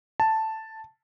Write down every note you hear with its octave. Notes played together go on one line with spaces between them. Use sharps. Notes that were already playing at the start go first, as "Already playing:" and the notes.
A5